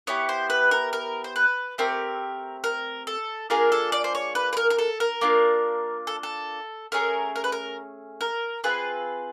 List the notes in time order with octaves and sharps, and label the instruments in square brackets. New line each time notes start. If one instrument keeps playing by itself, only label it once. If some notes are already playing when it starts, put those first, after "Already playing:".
[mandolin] B3 E4 G4 C#5
C5
B4
A#4
A#4
C5
B4
A3 C4 G4 A#4
A#4
A4
A#3 D4 F4 G#4 A#4
A4
D5
C5
C#5
B4
B4
A#4
A#4
A4
A#4
A#3 D4 F4
A4
A4
A3 C#4 G#4 A#4
A#4
B4
A#4
A#4
C4 F4 G#4 B4